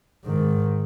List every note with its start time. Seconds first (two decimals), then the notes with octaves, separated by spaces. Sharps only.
0.24 G#2 D#3